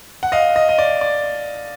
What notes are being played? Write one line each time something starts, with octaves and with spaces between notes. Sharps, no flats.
F#5
D#5 F5
D#5
D#5
D5
D5